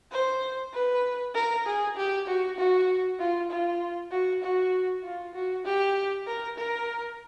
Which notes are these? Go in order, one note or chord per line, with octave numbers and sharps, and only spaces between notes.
C5
B4
A#4
G#4
G4
F#4
F#4
F4
F4
F#4
F#4
F4
F#4
G4
A#4
A#4